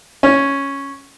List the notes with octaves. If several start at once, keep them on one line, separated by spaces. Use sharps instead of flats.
C#4